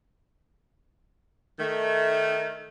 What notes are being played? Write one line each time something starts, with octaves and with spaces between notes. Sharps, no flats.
D#3 A3